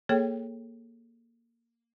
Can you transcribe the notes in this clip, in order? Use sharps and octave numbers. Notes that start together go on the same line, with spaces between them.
A#3 G#4 A4 C#5 G5